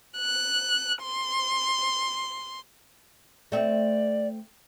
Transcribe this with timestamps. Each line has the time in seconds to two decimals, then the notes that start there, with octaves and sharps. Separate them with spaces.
0.17 F#6
1.00 C6
3.52 A3 C4 D5